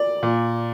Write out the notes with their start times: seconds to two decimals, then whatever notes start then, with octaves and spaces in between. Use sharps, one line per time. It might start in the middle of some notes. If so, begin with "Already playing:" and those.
Already playing: D5
0.23 A#2